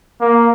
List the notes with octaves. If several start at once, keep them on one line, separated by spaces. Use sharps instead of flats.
A#3